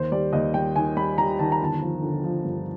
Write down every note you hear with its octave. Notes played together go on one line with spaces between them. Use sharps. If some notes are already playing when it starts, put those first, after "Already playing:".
Already playing: D#2 C5
G3 D5
D#2 D#5
G3 G5
D#3 G#5
G3 B5
G3 A#5
D#3 A5
A#5
G1 A5
F3
D3
F3
G2